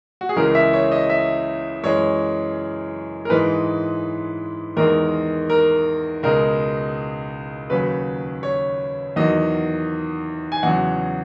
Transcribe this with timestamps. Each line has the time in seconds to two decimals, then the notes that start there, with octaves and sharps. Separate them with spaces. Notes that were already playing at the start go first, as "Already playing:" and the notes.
0.21 F#4
0.29 G#4
0.36 C#2 C#3 E3 G#3 A#4
0.55 E5
0.73 C#5
0.91 D#5
1.10 E5
1.83 F#2 E3 G#3 C#5
3.25 A#4
3.29 G#2 E3 G#3 B4
4.77 E2 D#3 G#3 A#4
5.50 A#4
6.23 C#2 B2 G#3 A#4
7.70 D#2 C#3 F#3 B4
8.43 C#5
9.16 E2 D#3 F#3 D#5
10.52 G#5
10.63 E2 C#3 F#3 F#5